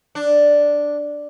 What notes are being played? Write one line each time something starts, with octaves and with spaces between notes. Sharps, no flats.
D4